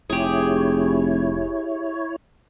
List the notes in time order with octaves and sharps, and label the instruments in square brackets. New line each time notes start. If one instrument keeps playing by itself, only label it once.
[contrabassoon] F1 [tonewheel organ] E4 C#5 [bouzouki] G4 G#4